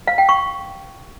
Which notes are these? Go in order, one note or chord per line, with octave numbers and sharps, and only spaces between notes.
F5
G5
C#6